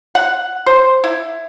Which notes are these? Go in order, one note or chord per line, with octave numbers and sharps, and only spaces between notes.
F#5
C5
E4